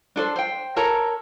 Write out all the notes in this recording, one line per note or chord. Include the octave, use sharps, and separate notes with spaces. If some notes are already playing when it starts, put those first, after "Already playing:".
D4 A4 C5
C5 G5
A4 A#4 C#5 A#5